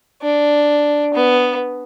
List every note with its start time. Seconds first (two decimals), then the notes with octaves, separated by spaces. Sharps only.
0.22 D4
1.14 B3